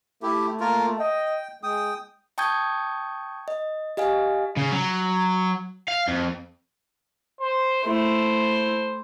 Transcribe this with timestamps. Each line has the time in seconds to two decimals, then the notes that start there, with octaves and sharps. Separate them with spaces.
0.23 A3 E4 G4
0.60 A#3 F4 A#4
0.99 D#5 G5
1.63 G#3 G5 D#6
2.38 G5 A5 C#6 D#6 G6 G#6
3.48 D#5
3.97 G4 D#5 F5 G#5
4.57 C#3
4.72 F#3
5.88 F5
6.08 F2
7.41 C5
7.84 A3 E4 C5